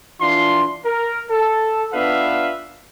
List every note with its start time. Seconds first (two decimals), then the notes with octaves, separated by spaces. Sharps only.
0.20 E3 D4 F4 C6
0.85 A#4
1.29 A4
1.93 B3 D4 F4 B4 E5 F5